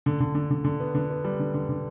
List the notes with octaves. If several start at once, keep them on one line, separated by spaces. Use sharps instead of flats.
D3
D3
D3
D3
D3
B3
D3
B3
G3
D3
D3
D3